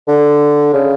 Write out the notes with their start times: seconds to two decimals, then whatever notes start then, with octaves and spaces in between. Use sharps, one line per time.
0.08 D3
0.73 C#3